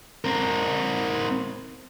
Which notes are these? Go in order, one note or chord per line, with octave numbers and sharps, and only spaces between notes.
C4 A#4